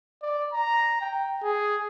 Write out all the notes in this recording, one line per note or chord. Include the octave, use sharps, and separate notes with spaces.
D5
A#5
G5
G#4